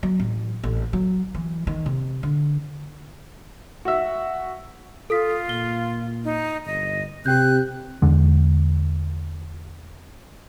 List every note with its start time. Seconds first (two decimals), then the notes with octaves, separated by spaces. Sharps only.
0.03 F#3
0.20 A1
0.63 A1
0.93 F#3
1.35 E3
1.67 D#3
1.86 C3
2.23 D3
3.85 F#4 E5
5.10 F4 A4 D#6 B6
5.49 A#2 G7
6.25 D#4
6.66 G1 D#5
7.26 C3 G4 G5 F#6 G6
8.02 E2 D3 G#3